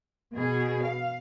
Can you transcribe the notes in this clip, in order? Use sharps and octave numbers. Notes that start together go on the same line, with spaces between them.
B2 G#4
F5